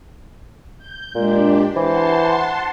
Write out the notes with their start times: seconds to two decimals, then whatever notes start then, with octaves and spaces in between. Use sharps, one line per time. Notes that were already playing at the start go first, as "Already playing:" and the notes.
0.78 G6
1.15 A#2 G#3 D4 G4
1.76 E3 C5 F#5 A5 C6